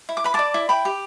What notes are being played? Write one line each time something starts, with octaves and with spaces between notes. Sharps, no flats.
E4
D6
B4 B5
D5 A5 D6
E4
E4 G5 B5
G4